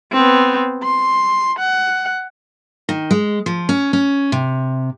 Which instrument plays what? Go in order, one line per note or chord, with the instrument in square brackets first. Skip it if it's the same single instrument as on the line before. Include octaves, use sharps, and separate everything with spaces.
[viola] B3 C4
C6
F#5
[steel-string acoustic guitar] D#3
G#3
F3
C#4
C#4
C3